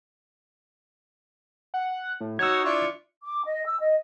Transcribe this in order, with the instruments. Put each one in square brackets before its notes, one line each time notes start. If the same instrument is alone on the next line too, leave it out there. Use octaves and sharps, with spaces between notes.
[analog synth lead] F#5
A2
[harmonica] D#4 F#4 C#5 [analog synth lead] C#6 [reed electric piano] E6 G#6
[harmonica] D4 E4 F4 [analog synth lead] C#6
[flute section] D6
D#5
E6
D#5